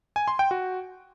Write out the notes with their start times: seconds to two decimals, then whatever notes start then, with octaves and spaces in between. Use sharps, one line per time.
0.16 G#5
0.28 C6
0.39 G5
0.51 F#4